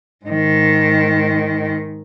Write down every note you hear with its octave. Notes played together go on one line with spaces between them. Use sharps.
G#2 D#3